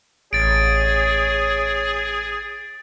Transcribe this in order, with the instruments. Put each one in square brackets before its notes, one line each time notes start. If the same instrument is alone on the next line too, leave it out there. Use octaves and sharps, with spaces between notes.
[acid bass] A1 [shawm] G#4 [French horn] C#5 [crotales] A6 D7